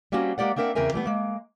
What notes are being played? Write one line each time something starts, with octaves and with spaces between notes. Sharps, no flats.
G3 A#3 C4 C#4 F#4
G#3 A#3 G4 D5 F#5
A#3 C4 D4 A#4 E5 F#5
E2 C#3 C4 A#4 E5 G#5
E3 G3 A3 B3
G#3 A#3